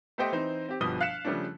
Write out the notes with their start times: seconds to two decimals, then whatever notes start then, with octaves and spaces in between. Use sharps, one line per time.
0.18 A3 B3 G4 C5 D#5 G5
0.32 E3 C4 D#4 C5
0.69 C4 G4
0.80 G1 B2 F3 G3 D#6 G7
1.01 F5 F#6 B6 C#7 E7
1.25 C#3 F3 G3 A3 C#4 D4